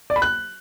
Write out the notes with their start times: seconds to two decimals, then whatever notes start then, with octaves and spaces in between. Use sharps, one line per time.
0.10 D5
0.16 B5
0.22 F#6